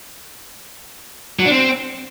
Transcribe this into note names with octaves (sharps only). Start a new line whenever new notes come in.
F#3
D4
C4